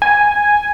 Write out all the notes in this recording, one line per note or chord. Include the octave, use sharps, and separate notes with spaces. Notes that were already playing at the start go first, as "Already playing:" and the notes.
G#5